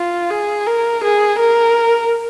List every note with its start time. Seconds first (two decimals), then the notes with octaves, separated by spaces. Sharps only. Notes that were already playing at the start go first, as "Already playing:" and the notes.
Already playing: F4
0.30 G#4
0.66 A#4
1.04 G#4
1.40 A#4